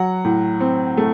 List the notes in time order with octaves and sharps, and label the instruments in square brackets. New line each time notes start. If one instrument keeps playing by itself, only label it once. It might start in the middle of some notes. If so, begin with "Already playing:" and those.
Already playing: [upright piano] F#3 F#5
A2
C4
A3